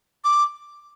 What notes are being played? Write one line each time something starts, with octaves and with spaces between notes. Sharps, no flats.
D6